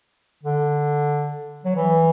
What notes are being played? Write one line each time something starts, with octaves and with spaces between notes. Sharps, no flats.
D3
F#3
E3